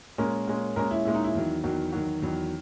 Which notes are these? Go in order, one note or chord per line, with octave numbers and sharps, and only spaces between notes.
A#2 G#3 C#4 A#4
A#2 G#3 C#4
A#2 G#3 C#4 A#4
E4
A#2 G#3 C#4 E4
D#4
E4
E2 D#3 F#3
E2 D#3 F#3 F#4
E2 D#3 F#3 F#4
E2 D#3 F#3